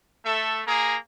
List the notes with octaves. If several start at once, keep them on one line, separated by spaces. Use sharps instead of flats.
A3 A4 E5
A#3 G#4 A#5